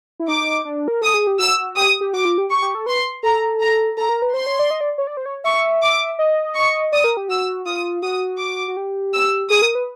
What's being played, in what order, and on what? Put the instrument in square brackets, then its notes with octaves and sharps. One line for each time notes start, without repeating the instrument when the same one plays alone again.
[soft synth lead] E4
[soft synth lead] D#4 [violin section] D6
[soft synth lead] D4
A#4
[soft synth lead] A4 [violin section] D#6
[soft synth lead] G#4
G4
[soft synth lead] F#4 [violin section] E6
[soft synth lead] G4 [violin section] D#6
[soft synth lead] G4
[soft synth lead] F#4 [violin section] D6
[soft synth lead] F4
G4
[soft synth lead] G4 [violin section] C#6
[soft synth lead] G4
A4
[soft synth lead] B4 [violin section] C6
[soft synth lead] A4 [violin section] A#5
[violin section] A#5
[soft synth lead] A4 [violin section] A#5
[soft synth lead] A#4
B4
[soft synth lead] C5 [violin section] C6
[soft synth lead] C#5
D5
D#5
D5
C#5
D5
C5
C#5
[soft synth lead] E5 [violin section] C#6
[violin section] D6
[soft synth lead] D#5
[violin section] C#6
[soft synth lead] D5 [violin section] D#6
[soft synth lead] A#4
G4
[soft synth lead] F#4 [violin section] E6
[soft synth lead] F4 [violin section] D#6
[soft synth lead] F#4 [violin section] D#6
[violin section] D6
[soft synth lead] F#4
G4
[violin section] E6
[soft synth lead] G#4 [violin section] D#6
[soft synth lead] A#4
B4